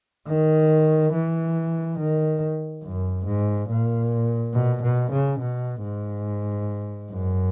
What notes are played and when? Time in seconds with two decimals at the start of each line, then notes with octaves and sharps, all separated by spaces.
0.27 D#3
1.13 E3
1.99 D#3
2.83 F#2
3.26 G#2
3.70 A#2
4.54 B2
4.83 B2
5.12 C#3
5.40 B2
5.83 G#2
7.12 F#2